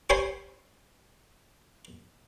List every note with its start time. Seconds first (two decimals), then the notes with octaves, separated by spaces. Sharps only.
0.10 G4 C5 C#5 G#5 B5 C6